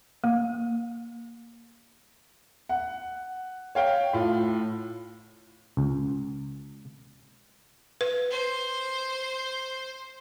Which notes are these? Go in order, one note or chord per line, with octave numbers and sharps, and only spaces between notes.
A#3
F#5
C#5 F5 G5
A2 F4
C#2
B4
C5